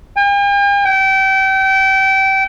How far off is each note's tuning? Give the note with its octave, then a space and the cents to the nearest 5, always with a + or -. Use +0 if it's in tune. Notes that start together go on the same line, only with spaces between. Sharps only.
G5 +45
G5 -30